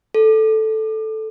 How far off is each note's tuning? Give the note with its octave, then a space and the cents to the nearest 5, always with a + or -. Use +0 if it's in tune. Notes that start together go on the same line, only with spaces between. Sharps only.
A4 -5